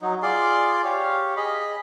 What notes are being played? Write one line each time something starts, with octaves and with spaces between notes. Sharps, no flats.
F#3 D#4
F4 G#4 D5 C6
G4 C#5 F5
G#4 D#5 B5